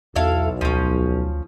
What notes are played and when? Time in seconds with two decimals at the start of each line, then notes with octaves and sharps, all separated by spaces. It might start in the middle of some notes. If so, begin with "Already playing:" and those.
0.16 B1 E2 E4 A4 F5
0.61 D2 F3 C#4